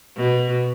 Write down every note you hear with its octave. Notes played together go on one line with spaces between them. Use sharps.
B2